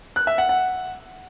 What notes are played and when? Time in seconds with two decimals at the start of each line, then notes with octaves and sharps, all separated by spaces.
0.16 F#6
0.27 E5
0.38 F#5
0.49 F#5